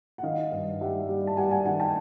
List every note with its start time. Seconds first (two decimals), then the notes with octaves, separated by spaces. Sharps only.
0.18 F#5
0.23 D#3 D#5 F5
0.52 G2
0.81 G3 E5 F#5
1.09 G3
1.27 A5
1.37 G3 F#5 G#5
1.51 F#5 G#5
1.65 D#3 F#5 G#5
1.80 G5 A5